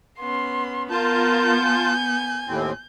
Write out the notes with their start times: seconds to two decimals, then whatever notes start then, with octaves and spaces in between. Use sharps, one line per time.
0.20 B3 C#4 C6
0.91 B3 F4 A#4 A5 G6
1.64 G#5
2.47 D#2 A2 C4